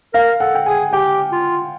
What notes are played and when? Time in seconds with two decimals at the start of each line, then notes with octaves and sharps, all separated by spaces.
0.14 A#4 F5
0.40 A4 F#5
0.55 G5
0.66 G#4 G#5
0.93 G4 G5
1.32 F4